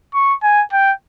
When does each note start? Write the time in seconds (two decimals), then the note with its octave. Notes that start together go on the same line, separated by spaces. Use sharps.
0.15 C#6
0.43 G#5
0.73 G5